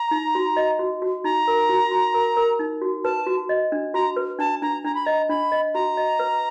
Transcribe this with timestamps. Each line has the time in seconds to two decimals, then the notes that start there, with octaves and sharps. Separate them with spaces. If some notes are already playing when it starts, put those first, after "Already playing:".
Already playing: A#5
0.11 D#4
0.35 F#4
0.57 D#5
0.79 F#4
1.02 F#4
1.24 D#4 A#5
1.47 A#4
1.69 F#4
1.91 F#4
2.14 A#4
2.37 A#4
2.59 D#4
2.82 F#4
3.04 B4 A5
3.27 F#4
3.49 D#5
3.72 D4
3.94 F#4 A#5
4.16 B4
4.39 D4 A5
4.62 D4 A#5
4.84 D4 A#5
4.95 B5
5.05 D#5 A#5
5.29 D4 B5
5.52 D#5
5.74 F#4 A#5
5.97 D#5
6.19 B4